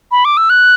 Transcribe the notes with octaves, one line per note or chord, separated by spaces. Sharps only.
B5
D6
E6
F#6